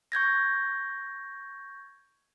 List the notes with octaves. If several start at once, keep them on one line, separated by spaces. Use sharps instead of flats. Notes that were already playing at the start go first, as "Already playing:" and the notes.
C#6 G6 G#6 A#6